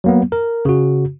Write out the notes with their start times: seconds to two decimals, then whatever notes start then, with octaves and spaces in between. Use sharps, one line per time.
0.04 F#3 A#3 B3
0.32 A#4
0.65 C#3 F#4